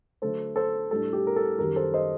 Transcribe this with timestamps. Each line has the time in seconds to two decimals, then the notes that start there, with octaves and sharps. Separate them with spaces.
0.22 D3 F#3 A3 A4 C5
0.56 A4 C5
0.91 A2 G3 D4 A4
1.13 G4
1.27 A#4
1.36 A4
1.59 F#2 D#3 G3 G4 A#4
1.76 A4 C5
1.94 C5 D#5